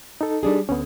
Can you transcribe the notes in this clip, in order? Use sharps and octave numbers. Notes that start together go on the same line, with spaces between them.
D#4 A4
G3 D4 G#4
D2 B3 C#4